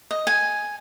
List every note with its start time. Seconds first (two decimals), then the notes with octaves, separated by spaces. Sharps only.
0.11 D#5
0.27 G#5